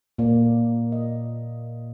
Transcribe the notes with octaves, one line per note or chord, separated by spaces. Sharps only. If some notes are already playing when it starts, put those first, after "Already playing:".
A#2 A#3 D5
D#5